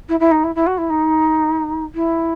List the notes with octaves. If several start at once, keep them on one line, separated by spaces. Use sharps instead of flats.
E4
E4
D#4
E4
E4
F#4
E4
D#4
E4